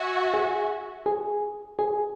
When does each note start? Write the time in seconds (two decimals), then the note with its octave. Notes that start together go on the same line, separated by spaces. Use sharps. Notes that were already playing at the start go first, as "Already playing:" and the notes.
Already playing: F#4 E5 G#5
0.34 G#4
1.06 G#4
1.79 G#4